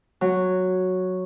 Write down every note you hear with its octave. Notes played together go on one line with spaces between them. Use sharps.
F#3